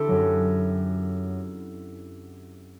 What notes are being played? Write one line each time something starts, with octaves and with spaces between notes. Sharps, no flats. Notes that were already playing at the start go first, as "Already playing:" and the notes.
Already playing: D3 C4 D4 E4 G4 A4
F#2 F#3